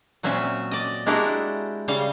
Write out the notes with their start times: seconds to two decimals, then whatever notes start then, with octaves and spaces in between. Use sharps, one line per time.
0.23 A#2 F#3 C4 C#4 E5
0.71 D5 D#5
1.06 G#3 D4 E4 F#4 G4 A#4
1.88 C#3 G3 F5